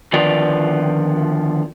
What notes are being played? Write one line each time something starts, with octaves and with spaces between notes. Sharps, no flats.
D3 D#3 F3 B3 F4 D5